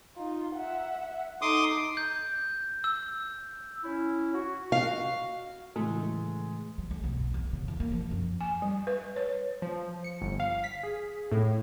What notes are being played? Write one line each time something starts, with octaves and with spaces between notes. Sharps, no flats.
D#4 F4
E5 F#5
D#4 A4 C6 D6 D#6
G6
E6
C#4 E4
F#4
F5
A2 C#3 E3 G#3 A3
F#3
A3
B1
G#2
E2
C#3
E2
A#3
F3
F#2
G#5
G3
B4
C#5
F3
C#7
G1
F5
B6
G#4
A2